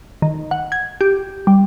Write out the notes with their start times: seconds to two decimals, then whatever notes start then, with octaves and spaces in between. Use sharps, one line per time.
0.22 D#3
0.51 F#5
0.72 G#6
1.01 G4
1.47 G3